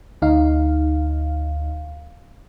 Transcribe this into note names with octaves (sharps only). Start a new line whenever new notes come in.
D2 D#4 F5